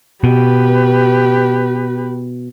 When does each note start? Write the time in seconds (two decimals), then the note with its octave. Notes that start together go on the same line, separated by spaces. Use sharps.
0.24 B2 G4 B4